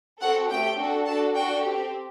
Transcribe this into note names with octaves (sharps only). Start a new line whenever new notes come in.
C4 F#4 A4 F#5
A3 C4 G4 G5
D4 F#4 A4
D4 F#4 A4 A5
D4 F#4 A4 G5
C4 G4